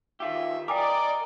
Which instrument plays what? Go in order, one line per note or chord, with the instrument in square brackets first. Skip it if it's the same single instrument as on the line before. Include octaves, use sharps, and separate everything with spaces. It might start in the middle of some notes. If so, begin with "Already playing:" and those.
[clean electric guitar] D#3 F4 G4 [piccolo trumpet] E5
[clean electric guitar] A#4 [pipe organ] D5 [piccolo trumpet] D#5 [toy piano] G5 G#5 D6